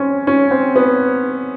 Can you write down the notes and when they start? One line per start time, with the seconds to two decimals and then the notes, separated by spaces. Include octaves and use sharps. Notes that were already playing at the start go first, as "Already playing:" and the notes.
Already playing: C4 C#4
0.27 C#4
0.51 C4
0.76 B3